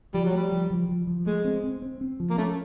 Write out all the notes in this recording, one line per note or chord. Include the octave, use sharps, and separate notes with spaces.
F3 G3
F#3
G3 A3
F3
F3
F3
F3
G#3 A3
C4
C4
C4
C4
F3
A#3
A3 C#4